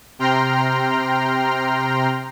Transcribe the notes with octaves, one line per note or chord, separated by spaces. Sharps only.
C3 G5 A#5 C6 F6